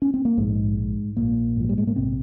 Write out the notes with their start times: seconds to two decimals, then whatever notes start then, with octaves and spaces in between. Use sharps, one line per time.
0.02 C#4
0.14 C4
0.25 A#3
0.37 A#1 G#2 G#3
0.77 G#2
1.17 A#1 A#2 A#3
1.56 G#2 F3
1.69 G3
1.78 G#3
1.87 A#3
1.96 A#1 C3 C4